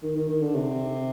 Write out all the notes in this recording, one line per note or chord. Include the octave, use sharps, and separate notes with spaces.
D#3
D#3
D#3
D3
C3